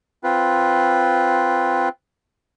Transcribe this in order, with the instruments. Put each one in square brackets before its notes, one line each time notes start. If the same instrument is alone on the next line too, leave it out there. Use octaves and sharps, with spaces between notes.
[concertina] C4 F4 B4